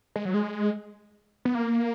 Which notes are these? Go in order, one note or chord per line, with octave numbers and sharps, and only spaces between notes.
G#3
F#3
G#3
B3
A#3